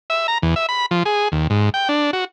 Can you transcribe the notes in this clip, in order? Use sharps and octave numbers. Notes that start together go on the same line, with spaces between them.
E5
A#5
E2
E5
B5
F3
G#4
D#2
G#2
G5
D4
F#4